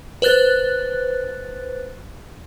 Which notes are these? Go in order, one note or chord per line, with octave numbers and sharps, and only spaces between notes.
B4 C5 F#6 A6